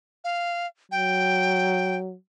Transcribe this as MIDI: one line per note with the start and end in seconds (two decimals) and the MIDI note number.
0.24 0.67 77
0.92 2.15 54
0.92 1.96 79